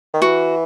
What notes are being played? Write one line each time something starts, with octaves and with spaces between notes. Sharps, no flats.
D#3
E3 F#4